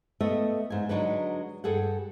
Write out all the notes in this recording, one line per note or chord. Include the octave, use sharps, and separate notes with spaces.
A3 B3 D#5 E5
G#2 G#5
D3 F#3 G#3 D4 D#4 B4
G2 G#4 A4 F#5